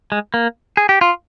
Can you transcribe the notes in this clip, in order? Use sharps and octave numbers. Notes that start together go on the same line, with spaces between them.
G#3
A#3
G#4
G4
F4